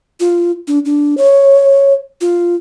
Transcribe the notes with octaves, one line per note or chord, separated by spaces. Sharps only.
F4
D4
D4
C#5
F4